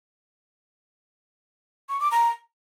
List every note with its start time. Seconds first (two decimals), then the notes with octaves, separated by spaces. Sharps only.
1.89 C#6
2.00 D6
2.11 A#5